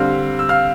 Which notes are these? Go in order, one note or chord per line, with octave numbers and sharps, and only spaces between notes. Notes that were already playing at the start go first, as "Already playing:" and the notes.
Already playing: D3 G3 C4 F5 F6
E6
F5 F6